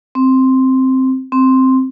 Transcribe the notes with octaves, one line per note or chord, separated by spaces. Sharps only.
C4
C4